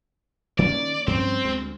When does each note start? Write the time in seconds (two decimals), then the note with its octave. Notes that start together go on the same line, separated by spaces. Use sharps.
0.59 D#3 A#3 C#4 D5
1.07 G2 F3 C4 C#4
1.45 D2 G#3